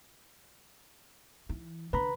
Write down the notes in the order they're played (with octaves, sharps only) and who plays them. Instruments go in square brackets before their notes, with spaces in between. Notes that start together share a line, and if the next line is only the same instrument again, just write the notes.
[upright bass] E3
[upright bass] D3 [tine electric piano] B4 A#5 B5